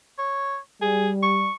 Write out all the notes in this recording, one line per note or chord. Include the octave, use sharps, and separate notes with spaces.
C#5
G3 G#4
C#6